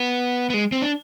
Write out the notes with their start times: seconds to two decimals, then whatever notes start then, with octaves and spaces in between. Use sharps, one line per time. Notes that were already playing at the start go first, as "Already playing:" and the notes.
Already playing: B3
0.50 B3
0.54 G#3
0.72 C4
0.82 D4